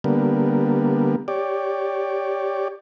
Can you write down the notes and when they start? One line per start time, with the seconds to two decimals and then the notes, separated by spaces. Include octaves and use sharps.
0.04 D3 G3 A#3 B3
1.28 G4 C#5 D5